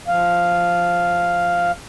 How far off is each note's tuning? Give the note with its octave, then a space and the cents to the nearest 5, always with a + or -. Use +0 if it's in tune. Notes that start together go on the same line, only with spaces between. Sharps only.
F3 +0 F5 +0